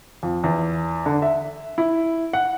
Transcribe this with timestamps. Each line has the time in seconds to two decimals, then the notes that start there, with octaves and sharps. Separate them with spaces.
0.23 F2
0.44 E2
1.06 D3
1.22 E5
1.78 E4
2.33 F#5